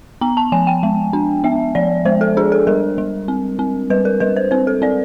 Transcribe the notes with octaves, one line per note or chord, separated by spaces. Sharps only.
B3 A#5
A5
F3 G#5
G5
G#3
D4
B3 E5
F3 D5
G#3 C5
A4
D4 G#4
A4
G3 A#4
G3
C4
C4
G3 B4
A#4
G3 B4
C5
C4 C5
A4
C4 D5